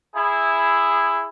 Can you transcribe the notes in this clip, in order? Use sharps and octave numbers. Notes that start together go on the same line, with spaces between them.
E4 G#4